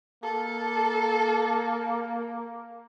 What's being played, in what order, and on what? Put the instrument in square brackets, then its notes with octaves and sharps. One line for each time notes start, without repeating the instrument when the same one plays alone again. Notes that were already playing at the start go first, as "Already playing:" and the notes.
[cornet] A#3 [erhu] A4